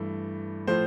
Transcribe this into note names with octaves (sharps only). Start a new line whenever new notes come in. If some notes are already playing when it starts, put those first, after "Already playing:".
Already playing: G2 E3 A3
A2 F3 A3 C5